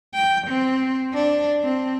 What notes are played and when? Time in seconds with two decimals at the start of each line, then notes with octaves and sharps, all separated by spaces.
0.14 G5
0.48 C4
1.14 D4
1.64 C4